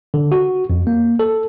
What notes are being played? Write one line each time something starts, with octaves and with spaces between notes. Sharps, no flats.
D3
F#4
F2
A#3
A4